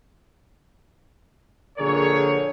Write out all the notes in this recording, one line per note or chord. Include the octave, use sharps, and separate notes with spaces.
A#1 D3 G#4 A#4 C#5